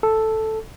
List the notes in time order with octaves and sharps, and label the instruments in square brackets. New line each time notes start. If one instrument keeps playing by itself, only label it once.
[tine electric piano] A4